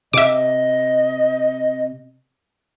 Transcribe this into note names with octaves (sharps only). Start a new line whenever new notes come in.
C3 D#5 E5 D6